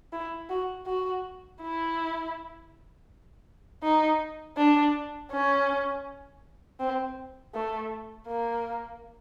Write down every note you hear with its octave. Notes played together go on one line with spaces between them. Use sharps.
E4
F#4
F#4
E4
D#4
D4
C#4
C4
A3
A#3